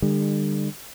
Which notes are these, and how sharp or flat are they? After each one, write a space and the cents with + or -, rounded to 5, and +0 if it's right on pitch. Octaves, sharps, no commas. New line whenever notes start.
D3 +35 G3 +40